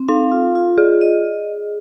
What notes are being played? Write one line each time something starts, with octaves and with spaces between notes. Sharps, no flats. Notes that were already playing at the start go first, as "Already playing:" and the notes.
Already playing: C4
D#4 F5
F4
F4
G#4 D#5
D#5